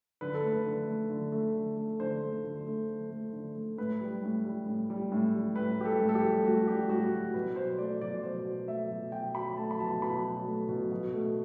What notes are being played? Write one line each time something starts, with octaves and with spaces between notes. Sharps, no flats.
D3 B4
A4
A3
B4
D3
A3
D3
A3
D3
A3
D3 C5
A3
D3
A3
D3
A3
D3
A3
A2 B4
G3
A2
G3
A2
G3
A2
G3
A2 B4
G3 G4
A4
A2
A4
G4
G3
A2 F#4
G3 G4
A2 F#4
G3
B2 B4
F#3 C5
A3 D5
B2 D5
B2 C5
F#3
A3 E5
B2
B2 G5
F#3 B5
A3 A5
B5
B2 A5
B2 B5
F#3
A3
B2
B2
A3